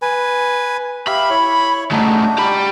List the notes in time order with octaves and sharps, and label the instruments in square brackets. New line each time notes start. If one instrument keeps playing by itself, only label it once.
[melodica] B4 G#5
[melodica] G4 E5 F5 [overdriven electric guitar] B5
[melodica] E4 C#5
[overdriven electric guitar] C#3 A3 [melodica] D4 D#4 F#4
[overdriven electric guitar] G4 B5